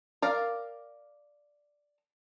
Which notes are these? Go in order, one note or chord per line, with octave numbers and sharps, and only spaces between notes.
A#4 D5 F5